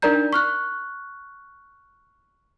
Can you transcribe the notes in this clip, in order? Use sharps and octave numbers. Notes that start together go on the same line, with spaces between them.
D4 D#4 A#4 D5 A#5 G6
C#6 F6 F#6